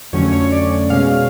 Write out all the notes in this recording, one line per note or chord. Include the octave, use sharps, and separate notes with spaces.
F2 D3 F#3 A3 C#4 C#5
C#5
D5
B2 G#3 C#4 F5